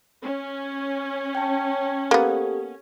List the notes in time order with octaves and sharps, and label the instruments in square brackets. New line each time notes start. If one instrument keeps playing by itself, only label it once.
[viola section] C#4
[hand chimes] G5 A5
[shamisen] A#3 B3 [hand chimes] G4 A4